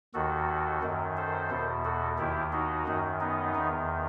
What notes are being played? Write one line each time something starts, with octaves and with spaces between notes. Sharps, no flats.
D#2 D#3 F#4 A4
F#2 D#3
A4 C5
E2 B2
F#4 A4
D#2 D#3 E4 G4
D#4 F#4
F#2 D#3
B3 D#4
E2 D#3